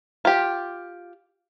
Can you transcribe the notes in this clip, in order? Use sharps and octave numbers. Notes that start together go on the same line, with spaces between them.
F4 G4